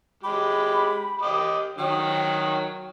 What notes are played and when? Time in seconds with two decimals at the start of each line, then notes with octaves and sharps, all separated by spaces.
0.24 G#3 G4 B5
1.21 G4 D#5
1.78 D#3 F#3 G5